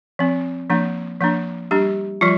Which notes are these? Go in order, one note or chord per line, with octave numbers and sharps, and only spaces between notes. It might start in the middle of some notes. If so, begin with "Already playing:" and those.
F3 C4
F3 A#3 D4
F3 A#3 D4
G3 D4 G4
F3 G3 F4